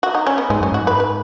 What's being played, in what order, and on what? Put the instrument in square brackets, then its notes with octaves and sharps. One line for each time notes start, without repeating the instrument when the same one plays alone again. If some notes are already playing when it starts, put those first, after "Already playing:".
[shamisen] F#4
D#4
C#4
B3
[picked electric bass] G#2 [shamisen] G#3
[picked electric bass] F#2 [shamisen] C#4
[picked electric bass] G#2 [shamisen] F#4
[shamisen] B4
B4